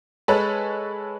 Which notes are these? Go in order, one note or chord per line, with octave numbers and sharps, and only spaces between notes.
G#3 A4 B4 C#5